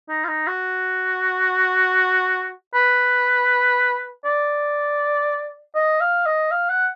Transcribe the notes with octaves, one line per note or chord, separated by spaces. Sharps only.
D#4
F4
D#4
F#4
B4
D5
D#5
F5
D#5
F5
F#5